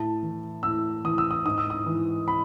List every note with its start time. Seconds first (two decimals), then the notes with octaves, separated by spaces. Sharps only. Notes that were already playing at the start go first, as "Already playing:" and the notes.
Already playing: A2 A5
0.23 E3
0.63 A2 E6
1.05 E3 D#6
1.18 E6
1.31 D#6
1.45 G#2 D#6
1.58 E6
1.70 D#6
1.86 E3
2.28 B5